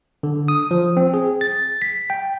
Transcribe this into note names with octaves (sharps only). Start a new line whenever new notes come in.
D3
D#6
F3
C4
G#4
A6
B6
G5